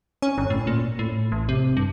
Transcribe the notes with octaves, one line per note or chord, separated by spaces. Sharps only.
C#4
G1
A2
A#2
A2
A1
C3
G2